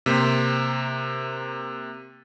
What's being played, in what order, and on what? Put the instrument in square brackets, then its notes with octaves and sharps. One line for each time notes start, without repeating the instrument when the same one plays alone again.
[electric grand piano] C3 A#3 C5